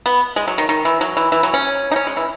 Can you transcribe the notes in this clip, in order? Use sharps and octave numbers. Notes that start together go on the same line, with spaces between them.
B3
G#3
F#3
D#3
D#3
E3
F#3
E3
E3
F#3
C#4
D#4
C#4
G#3
E3